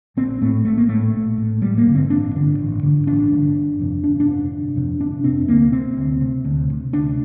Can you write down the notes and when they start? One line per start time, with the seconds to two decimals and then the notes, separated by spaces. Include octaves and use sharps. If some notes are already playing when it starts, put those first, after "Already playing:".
0.17 A#1 C4
0.41 A2 A3
0.65 A#1 A3
0.78 A#3
0.89 A2 A3
1.13 A#1
1.38 A2
1.62 A1 G3
1.78 A#3
1.86 G2 D3
1.95 C4
2.10 A1 D4
2.35 G2 D3
2.59 A1
2.83 G2 D3
3.07 A1 D4
3.31 G2 D3
3.55 G1
3.79 F2 C3
4.04 G1 D4
4.20 D4
4.27 F2 C3
4.52 G1
4.76 F2 C3
5.00 G1 D4
5.24 F2 C3 C4
5.48 D2 A#3
5.72 C3 C4
5.97 D2
6.21 C3
6.45 D2
6.70 C3
6.93 D2 D4